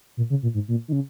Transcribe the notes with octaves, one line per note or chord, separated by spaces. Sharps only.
A#2
C#3
A#2
G#2
A#2
D#3
C#3